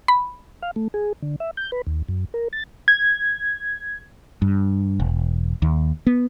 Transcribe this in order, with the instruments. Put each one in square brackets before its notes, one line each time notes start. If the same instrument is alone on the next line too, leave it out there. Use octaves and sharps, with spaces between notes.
[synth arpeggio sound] B5
[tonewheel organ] F5
A3
G#4
D3
E5
G6
B4
D#2
F#2
A#4
A6
[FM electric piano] G#6
[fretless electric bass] G2
E1
D#2
B3